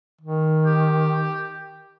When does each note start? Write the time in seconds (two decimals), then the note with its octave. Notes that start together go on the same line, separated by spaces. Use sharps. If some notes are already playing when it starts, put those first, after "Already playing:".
0.21 D#3
0.66 G4